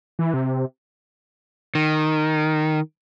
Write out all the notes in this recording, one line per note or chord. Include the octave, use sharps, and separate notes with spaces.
E3
C3
D#3